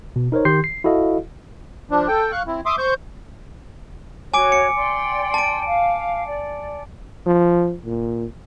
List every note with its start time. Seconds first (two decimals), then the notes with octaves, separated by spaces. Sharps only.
0.16 B2
0.32 D#4 A#4 C5 C#5
0.45 D#3 G4 C6 G6 C7
0.64 C7
0.84 E4 F#4 A4 D#5 F5
1.91 F3 D4
2.08 A4 G5
2.32 F5 C#6 F#6
2.47 C4 E4
2.66 E5 C6 D6 D#6
2.78 C5 C#6 G6
4.34 F#4 C#5 G#5 D6 D7
4.52 C#7
4.76 D5 G5 C6
5.34 A5 D7
5.67 F5
6.27 D5
7.27 F3
7.86 A#2